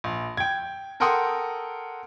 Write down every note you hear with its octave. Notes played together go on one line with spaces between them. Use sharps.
A#1
G5 G#6
A4 A#4 F#5 G5 C6 D#6